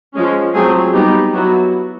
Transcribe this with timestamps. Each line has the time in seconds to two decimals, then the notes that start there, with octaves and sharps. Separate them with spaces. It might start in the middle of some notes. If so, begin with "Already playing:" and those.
0.14 F3 G#3 C#4
0.53 F#3 A3 C4 F4 G#4
0.93 G3 B3 D#4 G4
1.33 F#3 B3 E4 F#4